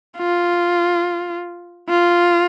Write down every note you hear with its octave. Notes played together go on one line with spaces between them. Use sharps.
F4
F4